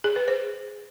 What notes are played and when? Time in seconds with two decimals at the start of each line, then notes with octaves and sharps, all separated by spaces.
0.04 G#4
0.16 B4
0.28 C5